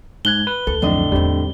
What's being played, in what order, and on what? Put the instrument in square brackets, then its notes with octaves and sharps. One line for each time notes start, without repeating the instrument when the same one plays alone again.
[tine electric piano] G#2 F#6 G#6 [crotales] G7
[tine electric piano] B4
[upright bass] D2 [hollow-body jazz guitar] A4
[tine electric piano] B1 F2 [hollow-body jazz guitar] A2 D3 D#5
[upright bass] E2 D#4 [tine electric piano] G3 C4